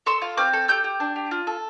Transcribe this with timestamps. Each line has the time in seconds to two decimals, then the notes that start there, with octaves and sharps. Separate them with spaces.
0.06 A4 C6 E6
0.22 F4
0.37 C4 D6 F6
0.53 A4
0.68 G4 E6 G6
0.84 G4
1.00 D4
1.16 G4
1.31 F4
1.47 A4